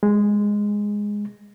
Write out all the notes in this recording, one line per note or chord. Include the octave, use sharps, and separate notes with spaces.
G#3